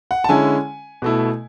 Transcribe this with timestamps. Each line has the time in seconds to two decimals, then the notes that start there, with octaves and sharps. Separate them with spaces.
0.11 F#5
0.24 A5
0.29 D3 G#3 C#4 E4 G#5
1.02 B2 A3 E4